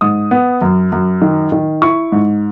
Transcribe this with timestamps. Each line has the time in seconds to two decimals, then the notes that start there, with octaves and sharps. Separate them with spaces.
0.01 G#2 D#6
0.31 B3
0.61 F#2
0.92 F#2
1.22 D#3
1.52 D#3
1.82 E4 C#6
2.12 G#2